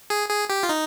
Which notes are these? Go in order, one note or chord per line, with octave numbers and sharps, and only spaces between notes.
G#4
G#4
G4
F4
D#4